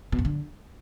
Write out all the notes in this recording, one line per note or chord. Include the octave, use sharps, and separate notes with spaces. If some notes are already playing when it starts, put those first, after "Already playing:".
B2
F#2
D3